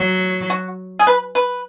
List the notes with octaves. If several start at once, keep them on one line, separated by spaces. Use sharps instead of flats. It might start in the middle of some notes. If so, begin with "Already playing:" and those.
Already playing: F#3
F#4
G#4
B4
B4